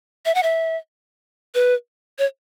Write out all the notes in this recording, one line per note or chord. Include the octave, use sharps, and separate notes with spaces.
E5
F#5
E5
B4
C#5